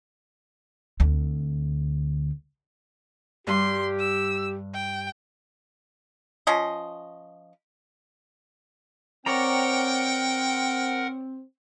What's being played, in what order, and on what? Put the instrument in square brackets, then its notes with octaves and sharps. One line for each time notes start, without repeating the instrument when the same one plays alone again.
[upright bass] D2 C4
[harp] G2 [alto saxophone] G4 [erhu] C6
[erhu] E6
G5
[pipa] F3 C#4 D#5
[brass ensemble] C4 [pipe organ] A#4 F#5 [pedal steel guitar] C#5 D5 A#5 [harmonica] G5